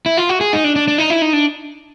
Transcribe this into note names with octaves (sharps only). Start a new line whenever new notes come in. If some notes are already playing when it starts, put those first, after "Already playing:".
E4
F4
F#4
G#4
D#4
D4
D4
D4
D#4
E4
D#4
D4